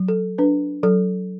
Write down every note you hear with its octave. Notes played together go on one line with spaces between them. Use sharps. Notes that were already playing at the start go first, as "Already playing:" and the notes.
Already playing: F#3
A4
D4 B4
F#3 A4